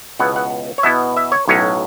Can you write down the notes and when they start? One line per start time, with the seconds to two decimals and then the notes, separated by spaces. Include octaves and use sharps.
0.19 C#2 B2 B3 E4 F#5
0.36 F#5
0.78 C#5
0.83 B2 B3 E4 E5
1.17 E5
1.32 C#5
1.48 B1 A2 F#3 C#4 C#5